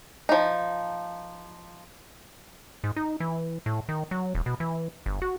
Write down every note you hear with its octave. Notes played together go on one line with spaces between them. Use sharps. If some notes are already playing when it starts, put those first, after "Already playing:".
F3 D#4
G#2
D#4
E3
A2
D#3
F#3
E1
B2
E3
G1
F#4